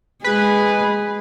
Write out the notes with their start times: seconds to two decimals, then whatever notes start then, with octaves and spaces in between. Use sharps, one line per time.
0.24 G#3 G#4 B4